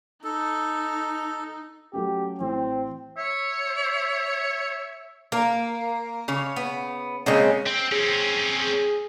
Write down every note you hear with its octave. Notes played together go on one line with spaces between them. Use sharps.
D#4 A4
F#3 A3 C#4 G4
A1 C4
C#5 E5
A#3 A#4
C#3 C#5
B3
C#3 G#3 A#3 C4 C#4
C4
C4 C#4 G#4